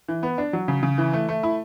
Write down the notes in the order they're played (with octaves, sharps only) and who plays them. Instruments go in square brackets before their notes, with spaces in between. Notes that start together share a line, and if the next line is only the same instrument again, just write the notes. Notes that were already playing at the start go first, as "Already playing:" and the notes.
[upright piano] E3
B3
D4
F#3
C#3
C#3
E3
A3
A3
E4